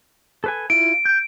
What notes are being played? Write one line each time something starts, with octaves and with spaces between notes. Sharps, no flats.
A4 B4 G#5
E4 F4 D7
G6